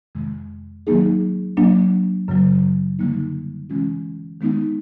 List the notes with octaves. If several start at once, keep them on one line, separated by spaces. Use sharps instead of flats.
F2 C3 D#3 G#3
D#3 F#3 A#3 D#4 G#4
F#3 A#3 D4
F#2 C#3 F#3
D3 G3 A#3 D#4
C3 E3 G#3 C#4 F4
D#3 G#3 B3 D#4